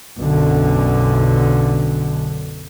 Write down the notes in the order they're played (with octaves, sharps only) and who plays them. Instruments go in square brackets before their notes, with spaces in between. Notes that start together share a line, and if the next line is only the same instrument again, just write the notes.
[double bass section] B1 F#2 D3